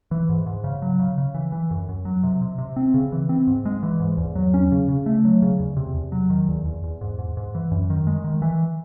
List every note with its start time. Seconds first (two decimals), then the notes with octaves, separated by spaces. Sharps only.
0.11 E3
0.29 G#2
0.46 G#2
0.64 C#3
0.82 F#3
0.99 C#3
1.18 C#3
1.34 E3
1.52 E3
1.71 F#2
1.89 F#2
2.05 F#3
2.23 C3
2.42 C3
2.58 C3
2.76 C4
2.94 C#3
3.12 E3
3.29 C4
3.47 G#2
3.66 G#3
3.83 E3
4.00 G#2
4.18 E2
4.36 F#3
4.54 C#4
4.72 C#3
4.89 C#3
5.06 A3
5.25 F#3
5.42 C#3
5.60 E2
5.77 C3
5.95 E2
6.12 F#3
6.30 D#3
6.48 E2
6.65 E2
6.84 E2
7.01 G#2
7.19 G#2
7.37 G#2
7.55 E3
7.71 F#2
7.90 D#3
8.07 G#3
8.24 D#3
8.42 E3